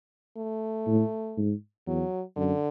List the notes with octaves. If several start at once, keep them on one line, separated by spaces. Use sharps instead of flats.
A3
A2
G#2
E2 F#3
F#2 D3